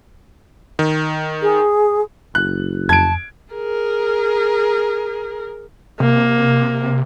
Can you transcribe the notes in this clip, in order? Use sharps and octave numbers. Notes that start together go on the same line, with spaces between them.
D#3
G#4
F#1 F#6
F2 A5 G#6 D7
G#4 A#4
C3 A#3